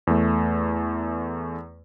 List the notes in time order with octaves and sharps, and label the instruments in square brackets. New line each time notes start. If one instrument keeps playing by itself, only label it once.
[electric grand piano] E2 A3